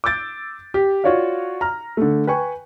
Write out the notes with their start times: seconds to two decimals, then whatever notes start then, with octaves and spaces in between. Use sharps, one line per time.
0.04 D6 E6 G6 A6 D7
0.74 G4
1.04 F4 F#4 C#5 D5 F5
1.61 A#5 F6
1.97 D3 A3
2.27 B4 G5 G#5 C#6